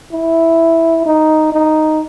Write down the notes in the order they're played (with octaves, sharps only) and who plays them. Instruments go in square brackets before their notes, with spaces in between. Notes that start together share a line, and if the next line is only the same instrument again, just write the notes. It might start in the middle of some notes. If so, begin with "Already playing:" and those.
[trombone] E4
D#4
D#4